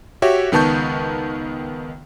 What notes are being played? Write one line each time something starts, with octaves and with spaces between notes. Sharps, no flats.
F#4 G4 C#5 E5
C#2 D#3 B3 A5 C#6 G6